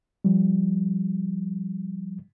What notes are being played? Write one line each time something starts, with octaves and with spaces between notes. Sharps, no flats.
F3 G3